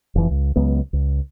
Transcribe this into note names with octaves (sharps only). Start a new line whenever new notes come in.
F1 E3
C#2
C#2 F#3 G#3 B3
C#2